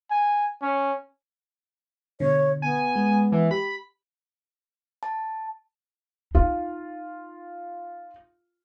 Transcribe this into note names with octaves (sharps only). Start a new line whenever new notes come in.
G#5
C#4
B2 D3 C#5
B3 G#5
G#3
E3
G4 B5
A5
D#4 F4